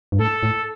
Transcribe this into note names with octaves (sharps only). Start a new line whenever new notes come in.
G2
A2 A4
A2